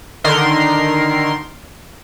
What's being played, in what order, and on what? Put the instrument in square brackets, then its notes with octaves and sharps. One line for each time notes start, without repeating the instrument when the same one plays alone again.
[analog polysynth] D3 D#3 A#4 C6